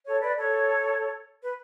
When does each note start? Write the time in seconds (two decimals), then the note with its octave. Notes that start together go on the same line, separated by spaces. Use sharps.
0.07 A4 C#5
0.21 B4 D5
0.36 A4 C#5
1.42 B4